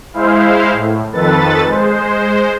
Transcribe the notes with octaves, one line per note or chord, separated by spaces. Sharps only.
G#3 E4 C5 F5
A2
F2 D#3 A4 B4 A6
G#3 C5